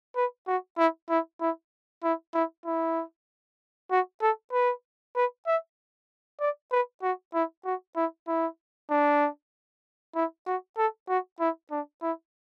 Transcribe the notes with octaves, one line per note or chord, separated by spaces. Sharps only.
B4
F#4
E4
E4
E4
E4
E4
E4
F#4
A4
B4
B4
E5
D5
B4
F#4
E4
F#4
E4
E4
D4
E4
F#4
A4
F#4
E4
D4
E4